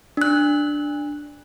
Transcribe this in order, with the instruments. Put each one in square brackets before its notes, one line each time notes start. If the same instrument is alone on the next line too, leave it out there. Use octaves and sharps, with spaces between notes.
[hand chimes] D4 F#6